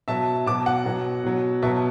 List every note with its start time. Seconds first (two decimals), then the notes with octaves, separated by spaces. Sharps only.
0.08 B2 F#3 E5 A5
0.46 B2 F#3 A5 D6
0.66 F#5
0.85 B2 F#3
1.24 B2 F#3
1.63 B2 F#3 E5 A5